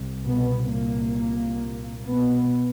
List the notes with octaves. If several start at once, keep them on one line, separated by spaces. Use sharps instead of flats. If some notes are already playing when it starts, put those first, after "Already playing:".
Already playing: C2
B2 B3
A#2 A#3
B2 B3